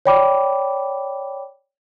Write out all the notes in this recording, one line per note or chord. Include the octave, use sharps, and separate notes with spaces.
C#5 D5 G5 B5 D6